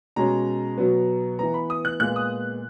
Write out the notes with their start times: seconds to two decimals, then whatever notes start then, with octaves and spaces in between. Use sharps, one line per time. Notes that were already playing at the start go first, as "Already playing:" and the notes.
0.16 B2 G#3 C#4 A#5
0.78 B2 F#3 B3
1.39 E3 B3 A#5
1.54 B5
1.70 D#6
1.85 F#6
2.00 A#2 G#3 B3 F#6
2.16 D#6